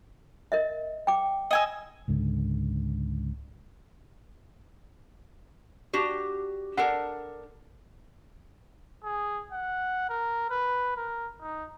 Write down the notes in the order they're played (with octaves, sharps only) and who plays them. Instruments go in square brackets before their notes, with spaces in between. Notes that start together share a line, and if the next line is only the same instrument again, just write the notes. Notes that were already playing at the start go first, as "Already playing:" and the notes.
[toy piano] A#4 D#5 E5
G5 D6
[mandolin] D#5 G#5 E6
[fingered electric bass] C#2 G#2 D3
[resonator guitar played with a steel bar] D4 F#4 G4
[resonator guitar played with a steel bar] D4 A4 A#4 [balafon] F#5
[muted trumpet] G#4
F#5
A#4
B4
A#4
D#4